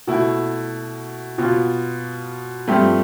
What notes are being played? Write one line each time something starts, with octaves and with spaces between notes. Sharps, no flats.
B2 A3 E4
B2 B3 F4
G2 F3 A3 C4 G4